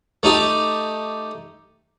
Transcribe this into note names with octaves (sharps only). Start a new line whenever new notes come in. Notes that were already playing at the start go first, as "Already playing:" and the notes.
A3 D#4 G4